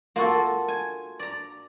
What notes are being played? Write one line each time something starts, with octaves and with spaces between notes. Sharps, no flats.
A#3 F4 F#4 A4
G#5
D5 A#5